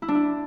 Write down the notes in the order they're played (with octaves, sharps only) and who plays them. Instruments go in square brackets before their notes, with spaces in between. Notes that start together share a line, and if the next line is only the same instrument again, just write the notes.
[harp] E4
D4
E4